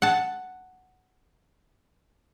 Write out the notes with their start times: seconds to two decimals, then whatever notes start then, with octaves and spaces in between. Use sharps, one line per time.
0.02 F#5 A5